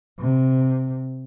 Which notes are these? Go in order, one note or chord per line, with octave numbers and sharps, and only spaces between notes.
C3